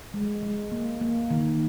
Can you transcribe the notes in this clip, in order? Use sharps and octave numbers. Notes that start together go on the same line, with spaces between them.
G#3
G#3
A#3
A#3
D#3